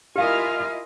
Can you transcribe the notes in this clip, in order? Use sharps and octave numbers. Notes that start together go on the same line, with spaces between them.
E4 F4 G4 A#4 D#5 F5 G#5 F6